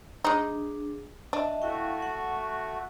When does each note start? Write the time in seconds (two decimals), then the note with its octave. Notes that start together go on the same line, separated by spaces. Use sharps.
0.25 G#3 D4 D#4 G#4
1.33 D4 D#5 E5 A5
1.62 A3 E4 F#4 F5 G5
2.02 F#5